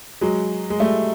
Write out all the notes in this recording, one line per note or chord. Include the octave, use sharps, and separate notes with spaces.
F#3 G#3
G#3
G3 A3